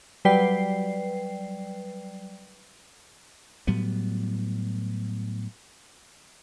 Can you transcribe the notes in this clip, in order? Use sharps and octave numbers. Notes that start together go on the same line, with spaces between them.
F#3 G3 B4 D5 G5 C7
A2 F#3 G3 B3